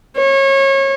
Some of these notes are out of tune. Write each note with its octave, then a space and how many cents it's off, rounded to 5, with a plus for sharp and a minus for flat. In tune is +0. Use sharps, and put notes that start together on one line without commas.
C#5 -30